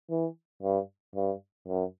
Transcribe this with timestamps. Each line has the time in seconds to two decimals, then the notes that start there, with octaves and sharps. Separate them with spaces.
0.10 E3
0.63 G2
1.16 G2
1.68 F#2